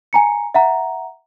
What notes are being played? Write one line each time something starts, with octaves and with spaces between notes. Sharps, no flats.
G#5 A#5 C#7
E5 F#5 A#5